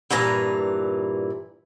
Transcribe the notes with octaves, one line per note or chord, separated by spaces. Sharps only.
G2 A#2 E3 A#5